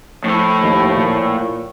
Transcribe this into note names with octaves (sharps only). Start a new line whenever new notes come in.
A2 F3 A3
D#2
A#2